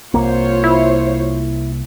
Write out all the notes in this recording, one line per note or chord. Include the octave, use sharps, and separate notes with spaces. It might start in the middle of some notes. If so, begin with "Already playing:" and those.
C2 A#3 F4 C5 C#5
E4